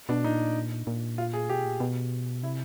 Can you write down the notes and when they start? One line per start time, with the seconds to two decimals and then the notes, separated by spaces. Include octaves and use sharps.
0.09 B2 D4
0.24 A#2 D#4
0.87 A#2
1.18 F4
1.33 G#4
1.49 B2 G4
1.65 A#2
1.80 B2
2.43 C3 E4